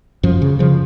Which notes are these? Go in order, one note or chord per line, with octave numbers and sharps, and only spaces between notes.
F#2 F3
C#3
C#3 F3